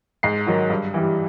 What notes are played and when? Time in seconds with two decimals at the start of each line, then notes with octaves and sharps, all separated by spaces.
0.23 G#2 C7
0.47 D#3 F#3
0.70 G2
0.94 E3 G3